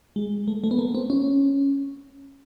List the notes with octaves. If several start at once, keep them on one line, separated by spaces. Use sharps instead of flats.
G#3
A3
A3
B3
A#3
C4
C#4